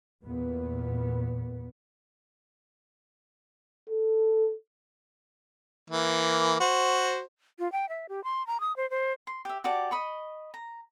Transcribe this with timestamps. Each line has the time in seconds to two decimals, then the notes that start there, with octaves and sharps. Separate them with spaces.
0.23 E2 A#2 B3
3.89 A4
5.90 E3 A#3
6.60 F#4 C5
7.59 F4
7.72 G5
7.89 E5
8.09 G4
8.24 C6
8.47 A#5
8.60 D#6
8.77 C5
8.90 C5
9.27 C6
9.45 G4 E5
9.64 F#4 G4 D5 A5
9.91 D#5 B5 C#6
10.54 A#5